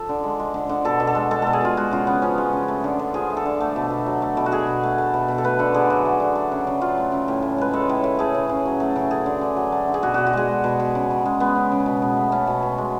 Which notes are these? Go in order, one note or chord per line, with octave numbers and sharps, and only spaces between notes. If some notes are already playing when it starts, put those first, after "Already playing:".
Already playing: F3 A4
D3
G#3
G#3
D3
D3
B2 A4
B2
A4
G#3
G#3 A4
B2 A4
G#4
B2 F4
G#3 F#4
C#3 F4
C#3 B3
F3 C#4
G#3
C#3
A3
D3
D3
F3 G#4
A3
A4
D3
A3
B2
B2
F#3
A3
B2
F#4
B2 G#4
B2
A3
A3
B2
B2
A4
A3 B4
D3 A4
D3 G#4
F#3 F#4
A3
D3
A3
C#3
C#3
F#3 F4
A3
C#3
A2
A2
G#3 B4
G#3 A4
A2
A2
A3 G#4
C#3
C#3
F#3
A3
C#3
A3 G#4
D3
D3
F#3
A3
D3
G#4
B2 F#4
B2 F#4
F#4
G#3 G#4
G#3
B2
B2
C#3
C#3
G#3
G#3 B3
C#3
C#3
B2
B2
A3
A3 C#4
B2
B2
G#3